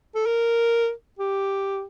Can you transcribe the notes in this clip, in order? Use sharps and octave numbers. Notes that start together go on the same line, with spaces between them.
A4
A#4
G4